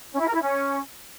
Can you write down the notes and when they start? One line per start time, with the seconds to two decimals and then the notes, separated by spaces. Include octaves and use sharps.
0.12 C#4
0.20 E4
0.27 A#4
0.34 E4
0.41 C#4